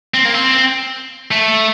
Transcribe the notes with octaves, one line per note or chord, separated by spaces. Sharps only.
C4
A#3
C4
A3